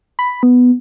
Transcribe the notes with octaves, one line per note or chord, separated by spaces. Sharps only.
B5
B3